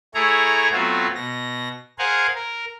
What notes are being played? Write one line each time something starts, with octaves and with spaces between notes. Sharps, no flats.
A3 E4 G#4 C#5 A#5
F#3 A3 B3 C4 F4 F#4
B2 A#6
G#4 A#4 C5 F5 F#5 G#5
A#4